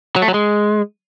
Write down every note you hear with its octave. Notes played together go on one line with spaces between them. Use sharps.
F#3
A3
F#3
G#3